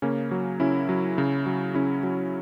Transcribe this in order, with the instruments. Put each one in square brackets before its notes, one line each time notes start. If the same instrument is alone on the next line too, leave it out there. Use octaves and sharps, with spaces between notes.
[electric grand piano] C#3 A#3 C#4
F#3
C#3 C#4 E4
F#3
C#3
F#3
C#3 C#4 E4
F#3